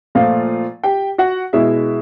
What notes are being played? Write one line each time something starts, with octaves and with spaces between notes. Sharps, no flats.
A#2 F3 A3 F4 F5
G4 G5
F#4 F#5
B2 G#3 E4 E5